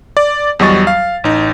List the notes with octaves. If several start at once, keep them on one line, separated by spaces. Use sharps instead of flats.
D5
E2 F#3 G3 D#5 C#6 A6
F5
A1 D#4